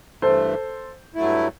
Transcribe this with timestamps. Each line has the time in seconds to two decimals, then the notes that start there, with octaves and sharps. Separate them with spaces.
0.22 G2 E3 A3 A4 C5
1.15 G2 F#3 A3 E4